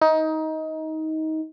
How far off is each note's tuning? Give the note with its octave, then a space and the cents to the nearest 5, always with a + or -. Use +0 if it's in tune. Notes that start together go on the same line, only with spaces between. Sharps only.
D#4 +20